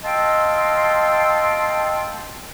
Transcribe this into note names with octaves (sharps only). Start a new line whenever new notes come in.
D#5 F5 G5 A5 C6 E6